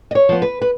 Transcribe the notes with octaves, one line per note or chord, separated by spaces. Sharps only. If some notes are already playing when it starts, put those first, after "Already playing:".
D#5
C#5
F3 B3
B4
B4